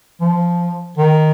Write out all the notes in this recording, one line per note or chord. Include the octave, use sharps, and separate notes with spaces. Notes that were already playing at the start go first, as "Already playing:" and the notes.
F3
D#3